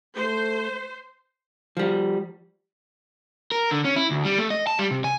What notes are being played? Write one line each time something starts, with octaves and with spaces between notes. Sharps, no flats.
A3 C5
F3 G3
A#4
D3
C#4
E4
D2
G3
A3
D#5
A5
G3
C3
G#5